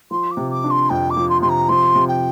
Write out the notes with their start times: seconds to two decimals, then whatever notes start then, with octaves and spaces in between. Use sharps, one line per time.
0.11 F3 C6
0.31 D6
0.37 C3
0.51 D6
0.64 D4
0.70 C6
0.90 F2 G5
1.10 D6
1.17 F3
1.29 C6
1.42 C3 C6
1.49 A#5
1.69 F3 C6
1.95 C3
2.08 G5